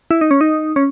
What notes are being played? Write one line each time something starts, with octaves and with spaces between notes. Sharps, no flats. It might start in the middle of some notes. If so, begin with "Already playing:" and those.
E4
D#4
C#4
D#4
C#4